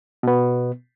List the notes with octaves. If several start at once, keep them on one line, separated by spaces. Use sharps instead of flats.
B2 B3